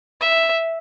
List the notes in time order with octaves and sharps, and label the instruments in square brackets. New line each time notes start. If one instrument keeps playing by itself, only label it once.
[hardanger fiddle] E5